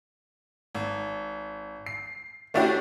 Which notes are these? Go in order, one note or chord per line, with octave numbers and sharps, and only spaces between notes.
G#1
C7
A3 C#4 D4 E4 F#4 G4